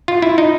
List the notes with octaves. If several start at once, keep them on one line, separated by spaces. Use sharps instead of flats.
F4
E4
D#4